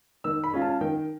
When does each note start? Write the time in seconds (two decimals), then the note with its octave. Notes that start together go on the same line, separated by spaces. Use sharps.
0.24 D#3 E6
0.44 B5
0.52 G#3 C#4 F4
0.62 A5
0.81 D#3 G5